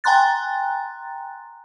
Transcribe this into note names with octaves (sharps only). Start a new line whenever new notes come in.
G5 G#5 A#5 C6 F#6 A6